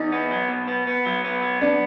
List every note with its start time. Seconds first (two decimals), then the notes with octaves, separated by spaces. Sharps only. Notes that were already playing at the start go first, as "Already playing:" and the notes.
Already playing: E2 D#4
0.12 B3
0.31 F#3
0.49 B2
0.68 B3
0.87 B3
1.06 F#3
1.25 B3
1.43 F#3
1.61 B3 D4